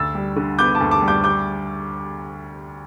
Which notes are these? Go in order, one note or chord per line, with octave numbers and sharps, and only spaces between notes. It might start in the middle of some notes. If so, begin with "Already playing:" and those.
Already playing: D2 E6 A6
G3
D3
B3 D6 G6
A5 D6
D2
A5 D6
G3
D6 G6
D6 G6